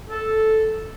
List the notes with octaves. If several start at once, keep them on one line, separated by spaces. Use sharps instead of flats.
A4